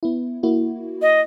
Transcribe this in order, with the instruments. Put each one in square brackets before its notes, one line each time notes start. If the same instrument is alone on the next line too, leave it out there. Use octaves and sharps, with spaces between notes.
[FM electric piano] B3 E4
A#3 E4 F#4
[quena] D#5